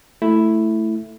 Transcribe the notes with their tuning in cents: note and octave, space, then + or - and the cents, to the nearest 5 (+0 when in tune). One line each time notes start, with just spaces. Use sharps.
A3 +0 E4 +0